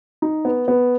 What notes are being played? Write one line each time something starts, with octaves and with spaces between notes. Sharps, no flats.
D#4
B3
B3